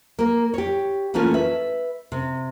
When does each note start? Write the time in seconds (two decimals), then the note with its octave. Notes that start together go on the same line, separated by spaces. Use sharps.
0.19 A#3 A#4
0.54 G4 C#5
1.14 E3 A3 A#3 C4 C#4 F4
1.34 B4 E5
2.12 C3